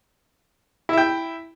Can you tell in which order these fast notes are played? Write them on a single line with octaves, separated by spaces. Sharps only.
E4 E5 G5